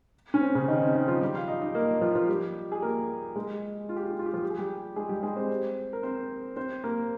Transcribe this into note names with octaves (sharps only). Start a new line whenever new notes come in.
C#4
C4
C#3 C#4
D#3 D#4
C4
D#3 D#4
F3 F4
G3 G4
F4 F5
D#4 D#5
D#4 D#5
A#3 A#4
F3 F4
F3 F4
G3 G4
G#4
A#3 A#4
G#3 G#4
F4
G4
F4
G4
F4
G4
F3 F4
G4
G#4
G3 G4
G#3 G#4
G3 G4
G#3 G#4
C4 C5
A#4
C4 C5
C4 C5
A#3 A#4